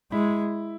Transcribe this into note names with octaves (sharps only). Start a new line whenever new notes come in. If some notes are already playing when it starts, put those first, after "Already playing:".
G#3 E4